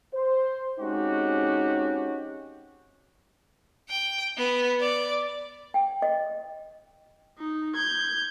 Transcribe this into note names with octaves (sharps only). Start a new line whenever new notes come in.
C5
G#3 C4 C#4 D#4 F#4 G4
G5
B3
D5
G5
D#5
D#4
G6 G#6